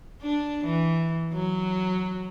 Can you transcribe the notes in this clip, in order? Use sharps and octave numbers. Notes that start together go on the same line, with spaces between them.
D4
E3
F#3